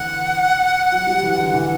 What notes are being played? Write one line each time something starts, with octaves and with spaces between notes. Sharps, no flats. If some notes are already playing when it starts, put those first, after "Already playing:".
Already playing: D3 E3 F#5
F#3
G3
E3
D3
E3